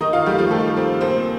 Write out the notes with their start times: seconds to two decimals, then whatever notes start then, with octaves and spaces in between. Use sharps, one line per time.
0.01 D#3 D#4 D#5
0.13 F4 F5
0.26 G3 A3 G4
0.38 F3 F4
0.51 D#3 A3 A4
0.77 C4
1.01 A#2 C4 C5